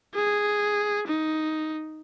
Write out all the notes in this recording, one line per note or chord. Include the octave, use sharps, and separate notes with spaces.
G#4
D#4